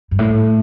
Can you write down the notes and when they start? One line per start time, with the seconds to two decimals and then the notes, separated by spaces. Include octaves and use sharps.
0.11 G2
0.19 A2